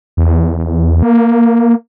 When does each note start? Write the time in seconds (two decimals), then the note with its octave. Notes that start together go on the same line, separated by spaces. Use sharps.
0.17 E2
1.02 A#3